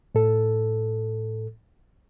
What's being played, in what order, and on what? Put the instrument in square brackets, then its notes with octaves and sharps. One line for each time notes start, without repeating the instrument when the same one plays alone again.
[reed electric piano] A2 A4